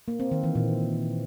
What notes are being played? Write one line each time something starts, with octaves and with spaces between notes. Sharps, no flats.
A#3
C4
D#3
E3
A#2